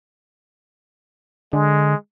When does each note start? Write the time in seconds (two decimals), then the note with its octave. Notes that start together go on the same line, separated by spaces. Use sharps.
1.53 D3 G#3